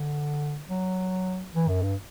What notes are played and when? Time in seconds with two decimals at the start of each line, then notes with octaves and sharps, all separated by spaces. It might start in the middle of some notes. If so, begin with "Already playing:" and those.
Already playing: D3
0.68 F#3
1.54 E3
1.68 F#2
1.82 G2